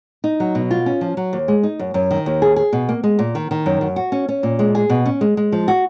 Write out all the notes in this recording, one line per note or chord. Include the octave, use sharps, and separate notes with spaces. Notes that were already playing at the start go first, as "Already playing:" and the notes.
D#4
F#3
B2
F4
C#4
F3
F#3
D#2
G#3
D#4
F#2
F#2
D#3
D#2
G#4
G#4
B2
A#3
G#3
A#2
D#3
D#3
F#2
F#2
F#4
C#4
C#4
A#2
G#3
G#4
B2
C#4
G#3
G#3
F3
F#4